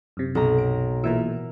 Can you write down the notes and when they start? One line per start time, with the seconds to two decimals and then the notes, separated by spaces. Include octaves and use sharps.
0.17 F#2 C3
0.35 B1 A#5
0.58 D7
1.04 A#2 E3 A#4 E5